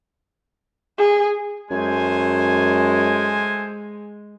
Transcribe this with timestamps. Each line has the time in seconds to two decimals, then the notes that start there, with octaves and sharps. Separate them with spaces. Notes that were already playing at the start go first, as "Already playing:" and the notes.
0.98 G#4
1.71 F#2 G#3 A3 C5 G#5